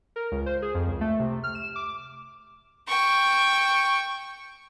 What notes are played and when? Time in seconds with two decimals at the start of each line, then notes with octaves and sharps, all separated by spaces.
0.16 A#4
0.31 C#2
0.46 C5
0.62 G#4
0.74 F2
0.87 C#2
1.01 A3
1.19 C3
1.44 F6
1.55 E7
1.76 D6
2.88 G5 C#6